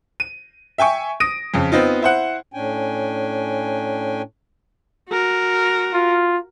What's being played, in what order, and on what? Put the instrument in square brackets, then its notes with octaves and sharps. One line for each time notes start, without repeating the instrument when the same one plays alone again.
[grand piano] D#7
E5 G5 G#5 C#6
D#6 A#6 D7 D#7
F2 C#3
B3 C4 D#4 F4
E4 C5 F#5
[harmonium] A2 C#4 D4 G5 G#5
[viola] F#4 A#4
[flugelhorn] F4